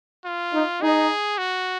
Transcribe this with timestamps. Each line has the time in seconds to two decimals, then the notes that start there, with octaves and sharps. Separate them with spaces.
0.25 F4
0.53 D#4
0.82 D#4 G#4
1.38 F#4